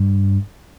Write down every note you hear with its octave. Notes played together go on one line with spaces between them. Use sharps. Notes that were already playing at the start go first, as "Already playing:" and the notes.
Already playing: G2